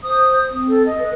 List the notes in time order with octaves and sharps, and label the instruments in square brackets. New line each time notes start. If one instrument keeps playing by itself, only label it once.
[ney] C5 [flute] D#6
[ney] C4
[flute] A4
D#5
[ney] B4